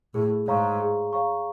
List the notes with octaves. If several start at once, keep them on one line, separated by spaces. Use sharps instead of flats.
A2 G#4
G#2 C#5 F5 A#5 C#6
G#4
C#5 F5 A#5 C#6